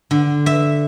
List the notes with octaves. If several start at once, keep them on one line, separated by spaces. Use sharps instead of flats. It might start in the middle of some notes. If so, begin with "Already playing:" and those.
D3
E5